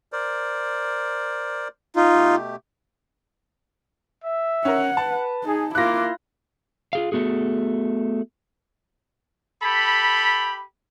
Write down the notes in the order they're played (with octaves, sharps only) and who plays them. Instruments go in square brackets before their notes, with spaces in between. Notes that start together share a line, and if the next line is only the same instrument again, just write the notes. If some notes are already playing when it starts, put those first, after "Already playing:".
[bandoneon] A#4 C5 D5
[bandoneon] F#2 C#4 F5 [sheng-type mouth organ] D#4 F4
[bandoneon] B2 A3 G4
[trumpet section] E5
[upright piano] C#4 A#4 [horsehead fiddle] F#5
[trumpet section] B4 [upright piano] A5
[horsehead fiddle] D#4 [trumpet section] G#4
[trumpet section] A#3 D6 [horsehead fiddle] E4 F4 [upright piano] F#6 A#6
[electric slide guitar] F4 G#4 F5
A3 B3 F#4 G#4
[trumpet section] G4 A4 B5